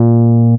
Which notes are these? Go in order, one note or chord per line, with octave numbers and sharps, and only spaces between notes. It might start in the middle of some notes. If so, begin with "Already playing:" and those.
Already playing: A#2